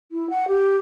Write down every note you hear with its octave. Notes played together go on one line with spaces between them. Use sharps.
E4
F#5
G4